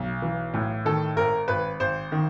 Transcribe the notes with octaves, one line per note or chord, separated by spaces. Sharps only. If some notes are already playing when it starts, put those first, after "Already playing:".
Already playing: B1
E3
A2
D#3 A4
G#1 A#4
G#1 B4
G#1 C5
D#3